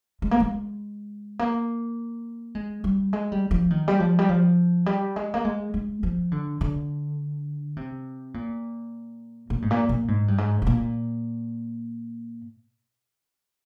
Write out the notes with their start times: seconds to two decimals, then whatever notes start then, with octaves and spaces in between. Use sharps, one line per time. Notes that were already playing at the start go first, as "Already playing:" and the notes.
0.22 G#3
0.31 A#3
0.40 G#3
1.39 A#3
2.55 G#3
2.84 G3
3.13 G#3
3.32 G3
3.51 F3
3.70 D#3
3.88 G3
4.00 F3
4.19 G3
4.29 F3
4.86 G3
5.16 G#3
5.34 A#3
5.44 G#3
5.74 G#3
6.03 F3
6.32 D3
6.61 D3
7.77 C3
8.34 A#2
9.50 A#2
9.62 G#2
9.71 A#2
9.89 A#2
10.08 G#2
10.28 G2
10.38 G#2
10.62 G#2
10.67 A#2